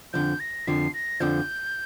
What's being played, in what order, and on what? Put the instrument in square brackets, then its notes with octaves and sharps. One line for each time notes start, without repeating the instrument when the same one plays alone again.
[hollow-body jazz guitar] F2 D3 F3 [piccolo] G6
[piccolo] A#6
[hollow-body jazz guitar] F2 D3 F3 [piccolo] C7
[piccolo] A#6
[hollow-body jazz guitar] F2 D3 F3 [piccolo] G6